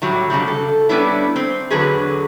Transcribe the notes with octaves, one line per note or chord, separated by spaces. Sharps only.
A2 F#3 G3
F2 C#3 F#3 G3
A4
G3 A3 B3 C#4 D4 E4
C4
E2 D3 F#3 G#4 B4